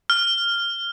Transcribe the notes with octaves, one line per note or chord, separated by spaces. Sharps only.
F6